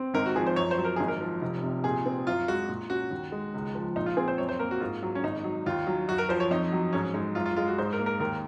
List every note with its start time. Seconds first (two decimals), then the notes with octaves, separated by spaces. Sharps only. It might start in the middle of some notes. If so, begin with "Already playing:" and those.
Already playing: C4
0.14 G#1 A#4
0.26 F#4
0.36 F3 G#4
0.47 C5
0.56 F#2 C#5
0.71 C5
0.78 F#3
0.85 A#4
0.96 G#1 G#4
1.08 A#4
1.21 F3
1.42 F1
1.63 C3
1.84 A#2 G#4
2.06 C4
2.27 F#2 F4
2.48 G#3 F#4
2.69 A#2
2.90 C#4 F#4
3.11 D#2
3.32 G#3
3.54 C#2
3.75 F3
3.96 A#2 D#4
4.06 F4
4.17 C4 G#4
4.28 C5
4.38 F#2 C#5
4.49 C5
4.59 A#3 A#4
4.71 F#4
4.80 G#2 F4
5.03 F#3
5.15 C#4
5.23 G#1 D#4
5.44 F#3
5.66 D#2 F4
5.87 F#3
6.08 F#2 F#4
6.18 A#4
6.29 F3 C5
6.40 C#5
6.51 F2 D#4
6.72 F#3
6.93 G#2 C#4
7.14 G#3 D#4
7.35 F#2 F4
7.46 F4
7.56 G#3 F4
7.68 F#4
7.78 G#2 C5
7.93 A#4
7.99 A#3
8.06 A#4
8.20 D#2 A#4